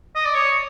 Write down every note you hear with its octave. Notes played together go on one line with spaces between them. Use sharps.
D#5
D5
C#5